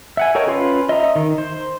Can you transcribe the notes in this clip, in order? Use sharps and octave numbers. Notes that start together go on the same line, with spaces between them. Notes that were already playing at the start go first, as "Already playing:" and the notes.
E5 F#5 G#5
A4 A#4 C#5 D#5 G5
C#4 F4 B4 C6
D#5 E5 A#5 D#6
D#3
C5